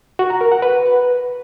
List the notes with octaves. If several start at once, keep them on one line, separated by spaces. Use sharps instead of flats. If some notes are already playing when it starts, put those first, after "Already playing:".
F#4
A#5
A#4
F#5
B4